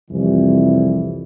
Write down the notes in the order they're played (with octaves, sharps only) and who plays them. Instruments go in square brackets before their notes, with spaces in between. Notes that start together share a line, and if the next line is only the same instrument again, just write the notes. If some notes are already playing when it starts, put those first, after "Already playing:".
[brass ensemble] C2 F2 E3